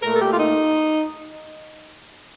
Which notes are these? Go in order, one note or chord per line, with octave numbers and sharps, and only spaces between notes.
A#2 A3 A#4
A4
G4
F4
D#4